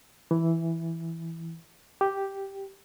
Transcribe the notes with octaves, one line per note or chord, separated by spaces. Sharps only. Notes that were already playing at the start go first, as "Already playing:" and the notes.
E3
G4